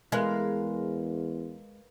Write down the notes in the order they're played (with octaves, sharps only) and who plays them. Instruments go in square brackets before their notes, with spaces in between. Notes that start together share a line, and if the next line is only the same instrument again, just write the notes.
[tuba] E2 [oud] G#3 [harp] A#4 B4 F5